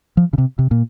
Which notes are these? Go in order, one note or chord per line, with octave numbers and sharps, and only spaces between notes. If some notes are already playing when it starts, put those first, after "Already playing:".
F3
C#3
C3
C3
A#2